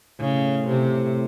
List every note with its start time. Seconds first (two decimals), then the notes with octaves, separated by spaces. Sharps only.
0.20 A2 C#3
0.68 C3